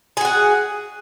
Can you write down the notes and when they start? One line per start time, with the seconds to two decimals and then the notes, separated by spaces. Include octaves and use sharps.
0.17 G#4
0.21 F#4
0.25 F#5